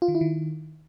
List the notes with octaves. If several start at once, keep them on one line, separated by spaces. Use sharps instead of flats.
F4
D#3
E4
D#3